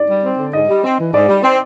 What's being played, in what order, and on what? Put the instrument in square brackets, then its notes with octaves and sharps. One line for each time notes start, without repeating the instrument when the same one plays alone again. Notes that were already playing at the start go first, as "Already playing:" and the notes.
Already playing: [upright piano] D5
[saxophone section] G3
C4
D3
[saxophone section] G#2 [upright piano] D#5
[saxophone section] G3
C4
E3
[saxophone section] G#2 [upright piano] D5
[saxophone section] G3
C4